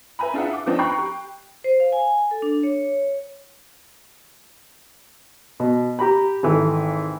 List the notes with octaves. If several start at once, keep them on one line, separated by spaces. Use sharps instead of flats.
B4 E5 G#5 A#5 B5
D4 E4 F4 G#4 E5 F#5
D6
F3 B3 C4 D4 D#4
G5 A#5 B5 C#6 F#6 C7
G4
C5
F5
G#5
A4
D4
C#5
B2
G4 A#5 B5
G#1 E3 A3